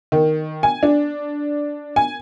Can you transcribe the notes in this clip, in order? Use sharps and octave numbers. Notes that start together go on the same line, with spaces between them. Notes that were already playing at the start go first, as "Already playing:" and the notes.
D#3
G#5
D4
G#5